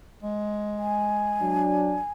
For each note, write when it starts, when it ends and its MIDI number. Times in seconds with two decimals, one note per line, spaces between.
0.23 1.66 56
0.79 2.12 80
1.41 1.99 54
1.41 1.99 62